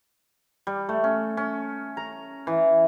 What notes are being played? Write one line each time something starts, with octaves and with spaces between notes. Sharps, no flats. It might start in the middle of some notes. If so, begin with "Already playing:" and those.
G3
A3
C#4
C#4
A#5
E3